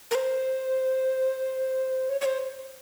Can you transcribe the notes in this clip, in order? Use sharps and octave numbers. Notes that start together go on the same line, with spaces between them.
A#4
C5
C#5
C#5
C5